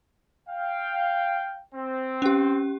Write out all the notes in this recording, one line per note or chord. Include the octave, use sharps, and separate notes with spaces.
F5 G5
C4
C#4 G4